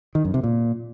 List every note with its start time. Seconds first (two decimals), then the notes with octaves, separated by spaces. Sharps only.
0.15 D#3
0.24 F#2
0.34 C3
0.44 A#2